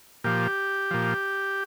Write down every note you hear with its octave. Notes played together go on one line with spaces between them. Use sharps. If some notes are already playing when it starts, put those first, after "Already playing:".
A#2 F3 G4
A#2 F3